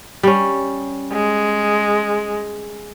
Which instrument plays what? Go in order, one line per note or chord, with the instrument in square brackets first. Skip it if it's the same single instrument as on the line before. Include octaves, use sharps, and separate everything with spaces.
[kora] G3 C#4
[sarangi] G#3